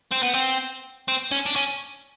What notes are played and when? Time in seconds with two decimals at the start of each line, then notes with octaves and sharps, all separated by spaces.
0.12 C4
0.23 B3
0.35 C4
1.08 C4
1.31 C#4
1.46 D4
1.56 C#4